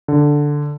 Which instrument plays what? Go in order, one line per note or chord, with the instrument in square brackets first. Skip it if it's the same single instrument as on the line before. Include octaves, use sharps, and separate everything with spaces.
[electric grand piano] D3